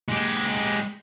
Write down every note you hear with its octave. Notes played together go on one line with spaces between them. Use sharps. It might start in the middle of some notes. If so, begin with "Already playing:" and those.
G#3 G4